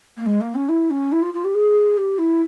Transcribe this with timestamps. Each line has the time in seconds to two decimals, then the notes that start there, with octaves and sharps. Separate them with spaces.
0.17 A#3
0.26 G#3
0.40 A#3
0.54 C#4
0.68 E4
0.90 C#4
1.12 E4
1.22 F4
1.33 F4
1.44 G4
1.54 G#4
1.97 G4
2.18 E4